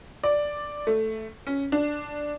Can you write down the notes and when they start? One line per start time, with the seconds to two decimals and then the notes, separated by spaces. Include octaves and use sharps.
0.24 D5
0.87 A3
1.47 C#4
1.72 D4